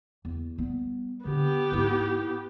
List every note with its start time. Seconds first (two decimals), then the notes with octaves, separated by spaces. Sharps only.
0.25 E2
0.58 G3 B3
1.25 D3 B3 G4
1.72 G#2 E4